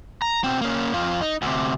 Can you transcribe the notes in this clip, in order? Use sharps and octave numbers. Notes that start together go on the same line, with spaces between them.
A#5
B2 C4
A#3 C#4
F2 F4
D#4
D2 C3